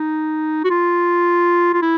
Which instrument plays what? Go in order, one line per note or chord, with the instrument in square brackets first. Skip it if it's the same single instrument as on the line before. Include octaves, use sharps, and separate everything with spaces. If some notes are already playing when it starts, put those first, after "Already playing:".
Already playing: [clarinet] D#4
F#4
F4
F4
E4